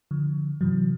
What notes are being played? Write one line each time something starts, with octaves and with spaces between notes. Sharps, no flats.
D3 F3
G2 C3 E3 F#3